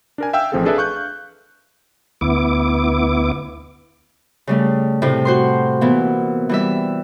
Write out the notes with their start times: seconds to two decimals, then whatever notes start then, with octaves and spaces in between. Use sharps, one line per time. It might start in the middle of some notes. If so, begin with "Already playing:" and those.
0.18 D4 A#4 G#5
0.33 E5 F5 G5 E6
0.52 A1 F3 C4 G#4 A4
0.65 D4 G#4 A4 B4 D5 E5
0.77 F5 C#6 F#6 G6
2.21 D2 B3 E4 D6
4.47 C#3 G3 A3
5.02 A2 C3
5.25 F#4 C5 C6
5.81 A#2 E3 B3
6.49 E3 G3 E5